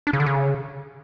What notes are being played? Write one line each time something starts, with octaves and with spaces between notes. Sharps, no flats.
D4
C#3
D3
C#3